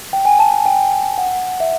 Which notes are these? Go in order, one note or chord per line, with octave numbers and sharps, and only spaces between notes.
G5
G#5
A5
G5
F#5
E5